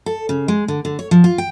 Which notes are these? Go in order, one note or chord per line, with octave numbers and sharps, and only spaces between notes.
A4
C#3
G#3
D3
D3
C#5
F3
F4
G5